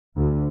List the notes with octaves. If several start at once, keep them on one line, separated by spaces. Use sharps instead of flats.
D2